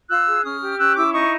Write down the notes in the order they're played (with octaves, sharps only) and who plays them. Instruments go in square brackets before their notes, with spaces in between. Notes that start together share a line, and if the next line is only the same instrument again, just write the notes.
[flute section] F4 E6 F#6
G#4
C#4 D#6 F6
G4
C#4 E6 F#6
E4 D6 E6
D#4 C#6 D#6